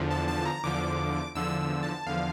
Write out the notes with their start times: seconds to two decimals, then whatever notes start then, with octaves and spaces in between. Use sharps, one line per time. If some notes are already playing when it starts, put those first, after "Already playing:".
Already playing: E2 D3 F3
0.11 A5
0.28 A5
0.45 A#5
0.64 E2 D3 F3 D6
1.35 E2 D3 F3 E6
1.59 E6
1.83 A5
2.06 E2 D3 F3 F5